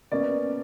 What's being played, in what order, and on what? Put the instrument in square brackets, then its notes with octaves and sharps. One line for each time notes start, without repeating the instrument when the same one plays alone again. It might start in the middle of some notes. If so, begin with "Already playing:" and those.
[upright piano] B2 A#3 C#4 D5